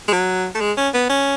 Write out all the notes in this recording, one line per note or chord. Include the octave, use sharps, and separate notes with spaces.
G#3
F#3
A3
G#3
C#4
B3
C#4